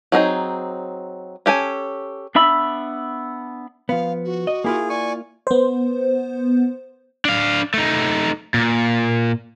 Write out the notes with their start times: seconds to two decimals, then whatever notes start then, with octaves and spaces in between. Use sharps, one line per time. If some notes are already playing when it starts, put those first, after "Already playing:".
0.12 F#3 C4 D#4 G#4
1.46 C#4 G4 A4 G#5
2.35 B3 D4 E5 B5 E6
3.89 F3 B3 F5
4.25 F#4
4.47 D#5
4.64 A#3 E4 F4 G#4
4.89 D5 G#5 C#6
5.47 B3 C5
7.25 D4 F5
7.74 A3 D#4
8.54 A#2